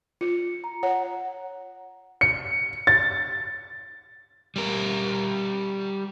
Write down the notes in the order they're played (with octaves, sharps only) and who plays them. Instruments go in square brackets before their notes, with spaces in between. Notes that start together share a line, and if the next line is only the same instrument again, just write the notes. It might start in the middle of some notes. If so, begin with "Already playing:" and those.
[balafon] F4 [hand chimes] C#7
[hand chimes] A#5
[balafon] C#5 [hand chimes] F#5
[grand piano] C#7
A6
[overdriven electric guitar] G3 A#4